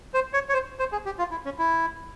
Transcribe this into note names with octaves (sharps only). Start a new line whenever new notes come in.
C5
C#5
C#5
C5
C5
G#4
G4
F4
E4
C#4
E4